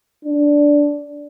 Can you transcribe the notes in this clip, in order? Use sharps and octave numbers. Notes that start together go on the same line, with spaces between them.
D4